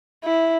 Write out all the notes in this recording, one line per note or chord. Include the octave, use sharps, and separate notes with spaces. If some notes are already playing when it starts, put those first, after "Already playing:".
E4